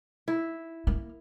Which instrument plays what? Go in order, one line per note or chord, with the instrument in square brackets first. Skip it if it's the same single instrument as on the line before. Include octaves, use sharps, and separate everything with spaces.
[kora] E4
[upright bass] A#3